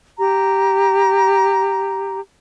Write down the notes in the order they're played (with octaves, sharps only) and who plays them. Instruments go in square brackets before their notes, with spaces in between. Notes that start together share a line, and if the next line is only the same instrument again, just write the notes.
[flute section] G4 A#5